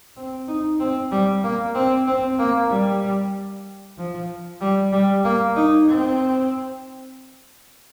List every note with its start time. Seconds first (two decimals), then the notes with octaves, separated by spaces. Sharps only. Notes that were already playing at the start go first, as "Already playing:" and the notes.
0.16 C4
0.48 D#4
0.80 C4
1.11 G3
1.43 A#3
1.75 C4
2.07 C4
2.39 A#3
2.70 G3
3.98 F3
4.61 G3
4.93 G3
5.24 A#3
5.56 D#4
5.88 C4